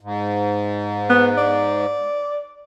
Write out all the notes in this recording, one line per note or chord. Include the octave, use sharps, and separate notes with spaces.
G#2
B3
D5